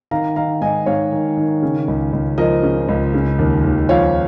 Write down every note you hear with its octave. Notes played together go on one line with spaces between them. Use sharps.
D#3 F5 A#5
D#3 F5 A#5
G#2 D#5 G#5
G#2 C#5 F5
D#3
D#3
C#3
C#2
C#2
F3 A#4 D#5
C#3
C#2
C#3
D#2
D#2
F3 C#5 F5